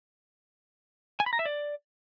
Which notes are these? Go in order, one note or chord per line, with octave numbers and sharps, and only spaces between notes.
G#5
B5
A#5
E5
D5